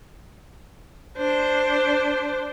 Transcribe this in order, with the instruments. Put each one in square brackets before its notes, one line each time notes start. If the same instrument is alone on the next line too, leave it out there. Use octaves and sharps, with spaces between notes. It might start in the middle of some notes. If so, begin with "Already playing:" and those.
[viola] D4 C5